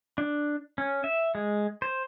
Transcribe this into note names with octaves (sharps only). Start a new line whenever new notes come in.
D4
C#4
E5
G#3
C5